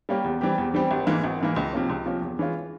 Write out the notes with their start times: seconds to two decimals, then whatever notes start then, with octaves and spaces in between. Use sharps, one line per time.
0.09 G3 A#3 C#4 G4
0.24 E2
0.41 E3 G3 C4 G4
0.58 E2
0.74 E3 G3 C4 G4
0.91 G#1
1.07 G#2 E3 A#3
1.24 G#1
1.40 G#2 E3 A#3
1.56 C#2
1.73 C3 F3 A#3 C#4
1.90 C#2
2.06 C3 F3 A#3 C#4
2.22 E2
2.39 E3 G#3 C#4 F4